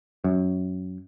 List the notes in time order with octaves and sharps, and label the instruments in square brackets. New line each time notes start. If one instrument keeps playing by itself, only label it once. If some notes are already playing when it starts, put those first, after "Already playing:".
[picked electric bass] F#2